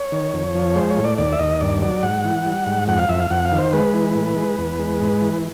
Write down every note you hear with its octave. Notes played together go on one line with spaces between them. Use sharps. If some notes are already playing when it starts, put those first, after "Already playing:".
Already playing: C#5
D#3
F2
F3
G#3 C5
C#5
A2
D5
D#2 D5
E5
D#2 D#5
G2 D5
F#3 D5
G#2 F#5
E3
G3
G#2
F2 F#5
F5
F2 E5
F5
F2 F#5
F5
D#3
C5
G#3 B4
E3
A2
G#3
E2
G#3
G#2
E3